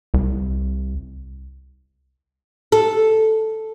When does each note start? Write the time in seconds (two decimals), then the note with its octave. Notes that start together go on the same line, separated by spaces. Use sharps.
0.14 C2
2.72 A4